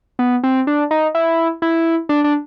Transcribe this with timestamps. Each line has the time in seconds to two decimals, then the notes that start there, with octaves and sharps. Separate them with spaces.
0.19 B3
0.44 C4
0.67 D4
0.91 D#4
1.15 E4
1.62 E4
2.09 D4
2.24 D4